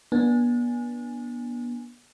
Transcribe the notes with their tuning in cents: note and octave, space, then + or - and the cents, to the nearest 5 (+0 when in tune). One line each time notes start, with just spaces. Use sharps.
B3 -35 D4 +0 G#5 +0